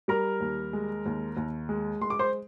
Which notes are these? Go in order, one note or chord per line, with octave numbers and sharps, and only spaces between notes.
G3 A#4 A#5
D#2
G#3
D#2
D#2
G#3
G#3 C6
D6
C5 C6